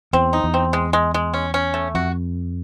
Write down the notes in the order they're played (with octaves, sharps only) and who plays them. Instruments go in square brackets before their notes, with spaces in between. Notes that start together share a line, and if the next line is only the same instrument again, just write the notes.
[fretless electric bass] E2 [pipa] C4
[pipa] D#4
[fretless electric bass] E2
[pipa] C4
G#3
G#3
G#3
C#4
C#4
A3
[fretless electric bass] F2 [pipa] F#4